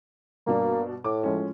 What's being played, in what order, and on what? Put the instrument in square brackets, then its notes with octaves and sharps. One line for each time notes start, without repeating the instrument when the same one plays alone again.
[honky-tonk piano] G2 B2 D4 [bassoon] A#3
[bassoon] A2 [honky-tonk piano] D6
[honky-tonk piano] F3 G#3 C#4